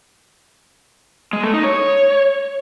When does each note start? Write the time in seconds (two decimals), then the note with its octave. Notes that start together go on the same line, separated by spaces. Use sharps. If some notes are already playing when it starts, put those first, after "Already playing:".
1.33 G#3
1.43 A3
1.54 D#4
1.64 C#5